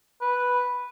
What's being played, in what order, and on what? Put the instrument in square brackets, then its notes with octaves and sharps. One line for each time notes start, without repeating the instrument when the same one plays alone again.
[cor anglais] B4